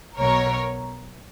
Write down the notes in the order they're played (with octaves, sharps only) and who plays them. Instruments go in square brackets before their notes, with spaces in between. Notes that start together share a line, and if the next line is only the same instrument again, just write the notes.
[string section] B1 B2 A#4 C#5